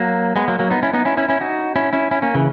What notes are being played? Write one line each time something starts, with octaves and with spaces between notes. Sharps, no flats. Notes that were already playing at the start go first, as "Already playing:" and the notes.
Already playing: F#3 A#3
G#3 B3
F#3 A#3
F#3 A#3
B3 D#4
C#4 E4
B3 D#4
C#4 E4
C#4 E4
C#4 E4
D#4 F#4
C#4 E4
C#4 E4
C#4 E4
A#3 C#4
C#3 E3